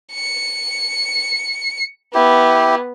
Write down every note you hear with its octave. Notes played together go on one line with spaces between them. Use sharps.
C#7
B3 E4 G4